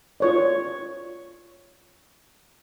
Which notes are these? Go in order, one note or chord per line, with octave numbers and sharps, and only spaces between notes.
F4 C#5 D5